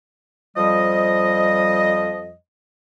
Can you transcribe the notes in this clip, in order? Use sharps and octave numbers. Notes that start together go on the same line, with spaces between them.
F2 F3 G3 D#5